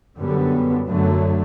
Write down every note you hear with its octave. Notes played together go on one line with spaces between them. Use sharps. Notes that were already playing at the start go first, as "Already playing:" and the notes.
F#2 D3 G3 B3
F#2 D3 F#3 A3